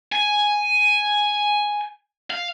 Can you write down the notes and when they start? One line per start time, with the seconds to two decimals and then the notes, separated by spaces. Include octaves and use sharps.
0.13 G#5
2.30 F5